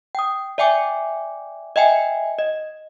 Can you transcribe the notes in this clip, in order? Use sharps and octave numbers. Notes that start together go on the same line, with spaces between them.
G5 D#6
D5 E5 G5 G#5 D6
D#5 E5 G5 G#5
D#5